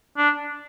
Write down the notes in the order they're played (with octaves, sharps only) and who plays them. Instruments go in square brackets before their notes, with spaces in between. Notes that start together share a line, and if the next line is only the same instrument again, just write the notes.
[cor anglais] D4